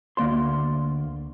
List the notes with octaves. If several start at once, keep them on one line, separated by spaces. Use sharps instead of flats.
D2 A#3 D5 C6